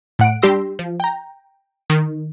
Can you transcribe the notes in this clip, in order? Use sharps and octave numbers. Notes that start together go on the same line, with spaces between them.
A2 F#5 D7
G3 D4 G4 C6 E6 A#6
F3
G5 A#5
D#3